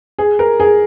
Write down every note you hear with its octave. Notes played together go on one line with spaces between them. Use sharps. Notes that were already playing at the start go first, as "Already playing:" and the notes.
G#4
A#4
G#4